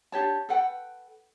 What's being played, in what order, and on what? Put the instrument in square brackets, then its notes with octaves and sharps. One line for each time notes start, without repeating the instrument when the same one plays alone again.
[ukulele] D4 G4 C#5 A5
A4 B4 F#5 G5